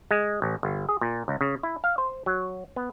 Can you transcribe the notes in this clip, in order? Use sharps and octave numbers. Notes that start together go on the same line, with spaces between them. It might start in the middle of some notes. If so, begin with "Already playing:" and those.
G#3
A1
G1
G#4
A#2
C#2
C#3
E4
F5
C5
F#3
B3